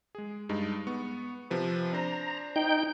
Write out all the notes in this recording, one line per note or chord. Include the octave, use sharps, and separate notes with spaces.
G#3 G#4
G2 G#3 D#4
B3 C#6
C3 F3 B4
D4 C5 A#5
D#4 G5 G6